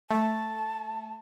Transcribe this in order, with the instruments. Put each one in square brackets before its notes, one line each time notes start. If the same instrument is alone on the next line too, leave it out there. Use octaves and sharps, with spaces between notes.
[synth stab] A3 [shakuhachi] A5